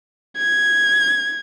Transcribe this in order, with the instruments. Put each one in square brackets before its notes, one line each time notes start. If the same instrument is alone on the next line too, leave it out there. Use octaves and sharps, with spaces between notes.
[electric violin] G#6